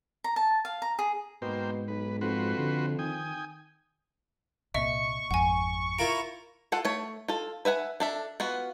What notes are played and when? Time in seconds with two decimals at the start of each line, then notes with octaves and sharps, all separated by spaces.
0.24 A#5
0.36 A5
0.65 F5
0.82 A#5
0.99 G#4
1.42 G#2 B2 A#3 C5 G5
1.88 B1 B4
2.21 F2 F#4 B4 C5
2.57 D3
2.99 D#3 G5 G#5 D#6
4.74 C2 A#2 D#5 E5 C#6
5.31 G#1 F2 F#5 G#5
5.99 E4 F4 A#4 D7
6.72 F4 A4 F#5
6.85 A3 C#5
7.28 F4 A4
7.65 B4 E5 F#5 G#5
8.00 D4 A4 E5
8.40 B3 F4 F#4